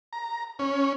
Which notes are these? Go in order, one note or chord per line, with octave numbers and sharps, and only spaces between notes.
A#5
C#4